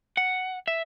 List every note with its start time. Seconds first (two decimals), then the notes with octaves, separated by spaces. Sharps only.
0.17 F#5
0.68 E5